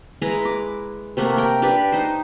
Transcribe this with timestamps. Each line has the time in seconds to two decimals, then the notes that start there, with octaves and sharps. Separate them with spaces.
0.22 G#3 E4 B4 A#5
0.45 D6
1.17 C3 A3 A#3 F#5
1.37 A#4 G5
1.62 D4 G4 B4 D5
1.92 D#4 C5